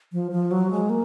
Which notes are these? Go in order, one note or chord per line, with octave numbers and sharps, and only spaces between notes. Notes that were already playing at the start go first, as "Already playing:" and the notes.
F3
F3
F#3
G#3
A#3